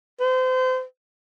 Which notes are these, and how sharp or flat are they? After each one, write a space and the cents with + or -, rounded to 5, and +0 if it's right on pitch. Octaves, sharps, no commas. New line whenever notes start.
C5 -30